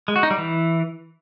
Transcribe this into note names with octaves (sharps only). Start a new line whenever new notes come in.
G#3
F#4
D#4
G3
E3